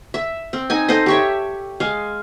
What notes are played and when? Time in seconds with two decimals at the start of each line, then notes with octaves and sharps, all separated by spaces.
0.14 E5
0.53 C4
0.70 D#4 G#5
0.89 D#4 A4 C5 D#5
1.06 G4 C#5 E5
1.80 G#3 F5